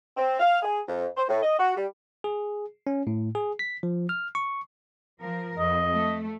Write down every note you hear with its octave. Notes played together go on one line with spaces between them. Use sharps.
C4
F5
G#4
F2
C5
A2
D#5
F#4
G3
G#4
C#4
A2
G#4
B6
F3
F6
C#6
F3 A#4
F2 D#5
A3